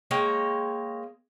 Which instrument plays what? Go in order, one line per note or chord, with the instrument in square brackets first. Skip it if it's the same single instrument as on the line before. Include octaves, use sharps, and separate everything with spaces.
[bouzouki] G#3 A#3 C#5 G5